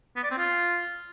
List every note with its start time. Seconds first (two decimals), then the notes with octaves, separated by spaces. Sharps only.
0.16 B3
0.24 D5
0.31 C4
0.38 F4